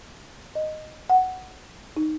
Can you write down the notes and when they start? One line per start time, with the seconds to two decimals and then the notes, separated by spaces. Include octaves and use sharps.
0.55 D#5
1.10 F#5
1.97 D#4